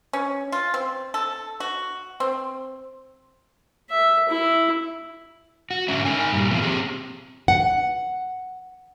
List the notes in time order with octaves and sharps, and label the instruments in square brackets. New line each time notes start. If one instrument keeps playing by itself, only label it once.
[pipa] C#4
F4
C4
A4
F#4
C4
[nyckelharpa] E5
E4
[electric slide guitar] F#4
G#2 D3 G#3 C#4 E5
D#4 A#4 G#5
G2 A#2 G3
E3 F3 A3 B3 F4
C4 G4 G#4
[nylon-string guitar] F#5